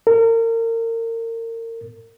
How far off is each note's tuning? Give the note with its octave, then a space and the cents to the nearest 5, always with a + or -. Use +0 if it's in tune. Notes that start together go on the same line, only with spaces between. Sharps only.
A#4 -35